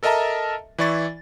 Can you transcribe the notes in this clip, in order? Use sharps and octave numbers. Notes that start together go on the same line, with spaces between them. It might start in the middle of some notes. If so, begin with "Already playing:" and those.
A4 A#4 D#5 E5 A5 A#5
E3 E4 D5 C#6 A6